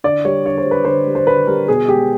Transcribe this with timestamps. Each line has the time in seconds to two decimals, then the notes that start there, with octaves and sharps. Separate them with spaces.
0.04 D3 D5
0.25 G3 C#5
0.45 D3 C#5
0.58 C5
0.66 G3
0.71 B4
0.85 D3 C5
1.07 G3
1.15 C5
1.27 D3 B4
1.47 G3 A#4
1.68 B2 G#4
1.88 G#3 G4